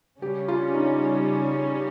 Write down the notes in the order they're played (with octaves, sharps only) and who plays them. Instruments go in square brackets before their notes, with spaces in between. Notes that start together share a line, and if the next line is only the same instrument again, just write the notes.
[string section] C#3 G3 C#4 [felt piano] G4
[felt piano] F4
D#4